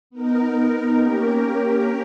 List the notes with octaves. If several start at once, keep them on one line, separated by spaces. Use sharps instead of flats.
B3 D#4 A#4
A#3 C#4 G4 A#4